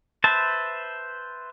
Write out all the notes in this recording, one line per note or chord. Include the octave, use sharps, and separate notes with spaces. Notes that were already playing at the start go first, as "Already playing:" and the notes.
B4 C5 E5 A5